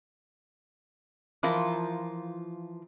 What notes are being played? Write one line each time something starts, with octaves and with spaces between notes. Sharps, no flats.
E3 F3 F4 A#4